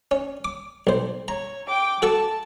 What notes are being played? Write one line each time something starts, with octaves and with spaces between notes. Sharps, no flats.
C#4
D6
B1 C5
C#5 A#5
G5 D6
F#4 A4 A5 C#6